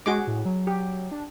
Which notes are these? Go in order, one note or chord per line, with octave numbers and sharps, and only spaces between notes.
G#3 F#4 G#4 D6
A2
F#3
G4
D4